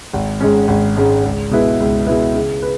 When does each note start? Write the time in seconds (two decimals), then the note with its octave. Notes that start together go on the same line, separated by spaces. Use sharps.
0.14 G#1
0.40 G#2 G#3 C#4
0.68 G#1
0.97 G#2 G#3 C#4
1.24 C#2
1.51 B2 G#3 E4 B4
1.80 C#2
2.07 B2 G#3 E4 B4
2.35 C#3
2.62 B4